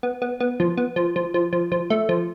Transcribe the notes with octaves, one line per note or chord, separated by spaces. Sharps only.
B3
B3
B3
F3
B3
F3
F3
F3
F3
F3
A3
F3